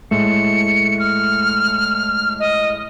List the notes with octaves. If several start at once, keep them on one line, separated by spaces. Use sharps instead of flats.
A2 G#3 A3 C#7
F6
D#5